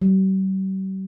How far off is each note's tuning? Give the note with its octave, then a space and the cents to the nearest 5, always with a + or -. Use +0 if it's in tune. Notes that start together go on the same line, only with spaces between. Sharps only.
G3 -45